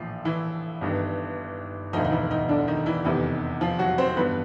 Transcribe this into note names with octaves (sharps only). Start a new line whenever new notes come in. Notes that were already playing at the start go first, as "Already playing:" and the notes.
Already playing: A#1 A2 E3 F3 F4
E3 E4
G1 G2 D#3
E1 D2 D3 D#3 F3 D#4
D#4
E3 E4
D#3 D#4
D3 D4
D#3 D#4
E3 E4
F1 E2 C3 D#3 E3 E4
F3 F4
F#3 F#4
C4 C5
G2 E3 B3 B4